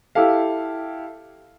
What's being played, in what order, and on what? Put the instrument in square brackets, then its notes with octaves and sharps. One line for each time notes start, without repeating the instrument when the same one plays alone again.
[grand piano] E4 G4 A4 F5